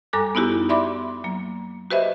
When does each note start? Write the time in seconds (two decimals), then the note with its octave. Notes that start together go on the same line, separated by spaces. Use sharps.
0.13 F#2 G3 A4 G#5 D6 F#6
0.35 B3 D#4 E4 F#4 G4
0.69 D5 E5 B5 C6 D6
1.24 F#3 A#3
1.91 F#4 G4 B4 C5 D#5 E5